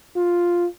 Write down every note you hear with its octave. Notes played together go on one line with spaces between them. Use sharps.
F4